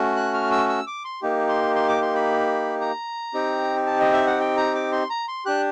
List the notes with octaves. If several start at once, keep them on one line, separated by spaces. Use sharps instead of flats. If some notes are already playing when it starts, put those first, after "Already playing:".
Already playing: A3 C#4 F#4
F#6
F6
E6
E6
D6
C6
A#3 D#4 G4
C6
C6
D6
C6
B5
A#5
C4 D#4 G4
A5
D#5
E5
F#5
G5
A#5
D6
C6
A#5
C6
D4 G4 F#6